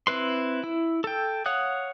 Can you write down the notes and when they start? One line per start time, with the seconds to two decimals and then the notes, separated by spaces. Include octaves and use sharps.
0.07 C4 E4 B4 C6
0.64 E4
1.04 A4 G5
1.46 C#5 F5 F#5 D#6 F#6